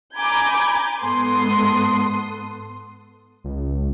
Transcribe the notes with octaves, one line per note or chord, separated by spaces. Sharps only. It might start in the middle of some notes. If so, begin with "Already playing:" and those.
G#5 A#5 B5 D6 G6 G#6
G#2 B3 A4 C6 D#6
C#2